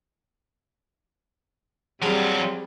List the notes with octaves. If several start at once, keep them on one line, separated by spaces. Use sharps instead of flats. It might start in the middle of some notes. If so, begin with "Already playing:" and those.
F#3 G3 C4 F4 G#4 A5 B5